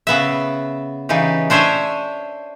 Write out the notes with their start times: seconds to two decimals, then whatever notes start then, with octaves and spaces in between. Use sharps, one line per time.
0.07 C#3 B3 E5
1.09 C#3 E3 D#4 G4
1.50 D4 C5 C#5 E5 G#5